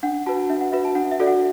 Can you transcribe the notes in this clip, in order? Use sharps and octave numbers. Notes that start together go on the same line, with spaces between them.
D4 F#5
F#4 B4 A5
D4 E5
F#5
F#4 B4 E5
A5
D4 F#5
E5
F#4 A4 D5
F#5